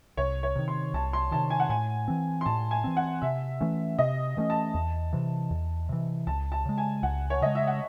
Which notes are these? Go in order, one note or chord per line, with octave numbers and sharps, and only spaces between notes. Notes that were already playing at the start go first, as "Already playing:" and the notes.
C2 C#5
C#5
C3 D#3
C6
C2 A5
C6
C3 D#3 A5
G#5
F#5
A2 G#5
E3 C4
C6
A2 A5
G#5
E3 C4
F#5
C3 E5
E3 A3 C#4
C3 D#5
E3 A3 C#4
A5
E2
C3 E3
E2
C3 E3
C#2 A5
A5
C#3 G#3
G#5
C#2 F#5
C#5
C#3 G#3 D#5
E5
F#5